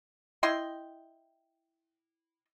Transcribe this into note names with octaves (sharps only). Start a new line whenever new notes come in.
E4 D#5 G5 C6